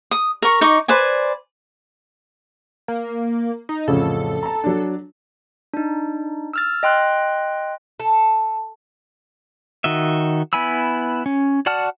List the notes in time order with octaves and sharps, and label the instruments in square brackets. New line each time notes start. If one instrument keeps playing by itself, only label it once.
[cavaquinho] D#6
A#4 C#6
D#4 D#5 C#6 D6
B4 C5 D5 G#5
[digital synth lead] A#3
D#4
[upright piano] A1 F2 C#3 [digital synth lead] A4
[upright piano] A5 A#5
F#3 D4
[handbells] D4 D#4
E6 F6 A6
D#5 G5 C6 F#6
[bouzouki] A4
[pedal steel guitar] D#3 F#4 D#5 E5
B3 E4 G#5 B5 E6
C#4
F#4 D5 F#5 A5 F6